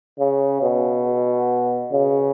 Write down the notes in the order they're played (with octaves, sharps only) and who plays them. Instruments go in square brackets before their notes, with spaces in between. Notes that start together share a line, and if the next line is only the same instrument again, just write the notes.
[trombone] C#3
B2
C#3